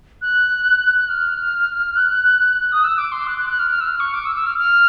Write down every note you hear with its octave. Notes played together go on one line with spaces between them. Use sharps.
F#6
F#6
F6
F#6
D#6
E6
D6
C6
F#6
F#6
F#6
F6
F6
E6
F6
C#6
D6
E6
E6
F6
F6